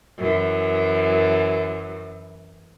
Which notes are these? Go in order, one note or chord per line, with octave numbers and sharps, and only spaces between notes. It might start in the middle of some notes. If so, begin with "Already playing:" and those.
F#2 E3